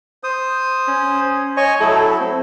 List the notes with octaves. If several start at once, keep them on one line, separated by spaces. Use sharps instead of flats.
C5 D#6
C#4
C#5 D#5 G#5 C#6
F#3 A3 E4 A4
C4